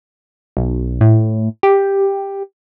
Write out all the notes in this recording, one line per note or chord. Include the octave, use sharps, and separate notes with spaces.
B1
A2
G4